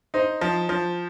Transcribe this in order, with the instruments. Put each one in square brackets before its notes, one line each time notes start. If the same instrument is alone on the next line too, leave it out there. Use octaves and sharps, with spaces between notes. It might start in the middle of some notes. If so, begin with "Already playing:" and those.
[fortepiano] D#4 [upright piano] C5
[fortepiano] F3
F3